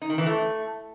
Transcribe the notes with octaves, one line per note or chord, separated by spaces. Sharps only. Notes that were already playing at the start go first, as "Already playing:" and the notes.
D#4
D#3
E3
A3